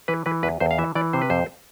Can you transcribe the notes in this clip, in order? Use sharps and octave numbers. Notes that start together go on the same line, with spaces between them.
E3 B4
E3 B4
E2 B4
E2 C5
F5
E3 E5
E3 D5
C3 C5
B4
F2 C5